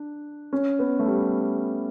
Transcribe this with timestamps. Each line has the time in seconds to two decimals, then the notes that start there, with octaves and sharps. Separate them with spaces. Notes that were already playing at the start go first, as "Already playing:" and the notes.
Already playing: D4
0.53 C#4
0.79 B3
0.99 A3
1.06 G3